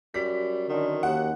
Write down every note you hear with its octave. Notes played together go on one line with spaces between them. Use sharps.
F#2 G3 B6
D3 D#3
D#2 F#5